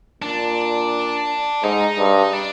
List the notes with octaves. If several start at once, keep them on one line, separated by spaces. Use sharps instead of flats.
A#2 D4
G#2 D#4
G2
D4